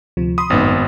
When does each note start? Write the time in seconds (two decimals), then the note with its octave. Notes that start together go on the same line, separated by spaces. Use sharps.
0.17 D2 C3 F3
0.38 B5 C6 D#6
0.50 G#1 F#2 A2 B3 D#4